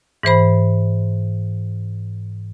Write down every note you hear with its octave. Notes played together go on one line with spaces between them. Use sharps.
G#2 E3 C5 B5